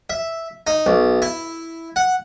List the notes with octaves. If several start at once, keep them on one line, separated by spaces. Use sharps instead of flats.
E5
D#4
B1
E4
F#5